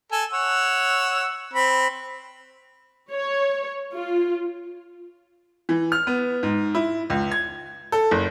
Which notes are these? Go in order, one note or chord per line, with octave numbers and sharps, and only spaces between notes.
A4 G#5
C#5 F#5 E6
C4 B5
C#5
F4
E3
F6
B3
G#2
E4
C#2
G#6
A4
F#1